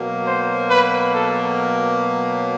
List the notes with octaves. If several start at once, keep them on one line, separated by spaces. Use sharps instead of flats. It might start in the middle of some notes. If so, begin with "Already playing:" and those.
Already playing: B2 F#3 A#3
C5
B4
A4